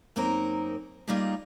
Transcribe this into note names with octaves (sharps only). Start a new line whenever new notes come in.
F#2 A#3 C4 D#4 A#4 A#5
G3 A#3 D#4 F4 G4 G#4